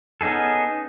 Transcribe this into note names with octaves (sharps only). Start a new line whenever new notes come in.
B3 C#4 D#4 G#4 A4